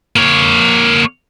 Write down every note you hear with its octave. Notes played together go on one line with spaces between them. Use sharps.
A#3 C#5